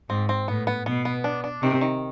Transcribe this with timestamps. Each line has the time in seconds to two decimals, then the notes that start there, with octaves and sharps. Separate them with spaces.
0.09 G#2 C4
0.29 C4
0.48 A2 B3
0.67 B3
0.86 B2 B3
1.05 B3
1.24 D4
1.44 D4
1.62 C3 D#3
1.81 D#3